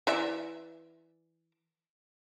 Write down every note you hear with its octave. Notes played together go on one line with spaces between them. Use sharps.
E3 D5 E5